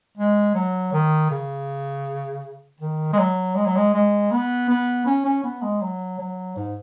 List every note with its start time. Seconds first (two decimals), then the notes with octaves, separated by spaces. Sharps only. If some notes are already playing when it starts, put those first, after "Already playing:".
0.18 G#3
0.55 F#3
0.93 D#3
1.31 C#3
2.80 D#3
3.13 G#3
3.19 F#3
3.55 G#3
3.66 F#3
3.76 G#3
3.94 G#3
4.31 B3
4.69 B3
5.06 C#4
5.25 C#4
5.43 B3
5.62 G#3
5.81 F#3
6.19 F#3
6.56 G#2